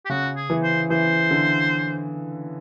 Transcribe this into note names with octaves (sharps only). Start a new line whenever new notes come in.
G4
C#3 F#4
G#4
E3
C5
E3 C5
D3